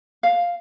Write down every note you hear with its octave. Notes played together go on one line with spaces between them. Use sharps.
F5